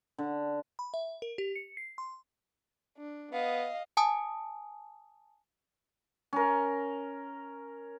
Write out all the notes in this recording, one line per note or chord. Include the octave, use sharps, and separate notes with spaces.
D3
B5
E5
A#4
G4
C#7
C7
C6
D4
B3 D#5 F5
G#5 A5 D#6
C#4 A#4